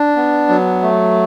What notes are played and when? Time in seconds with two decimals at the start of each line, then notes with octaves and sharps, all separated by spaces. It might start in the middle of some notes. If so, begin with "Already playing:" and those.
Already playing: D4
0.16 B3
0.49 F#3
0.82 A3